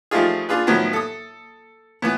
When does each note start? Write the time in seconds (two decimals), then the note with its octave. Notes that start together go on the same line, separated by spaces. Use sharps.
0.11 F3 G3 A3 D#4 F4 G#4
0.49 D4 F4 G#4 B4
0.67 A2 D#3 F3 F#3 B3
0.93 A4 D#6
2.02 A2 E3 B3